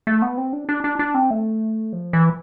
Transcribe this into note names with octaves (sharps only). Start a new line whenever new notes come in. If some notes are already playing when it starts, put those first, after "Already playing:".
A3
B3
C4
D4
D4
D4
D4
C4
A3
F3
E3